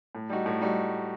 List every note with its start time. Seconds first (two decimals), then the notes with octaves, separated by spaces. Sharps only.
0.15 A2
0.30 G3 D#4 F#4
0.46 A2
0.61 G3 D#4 F#4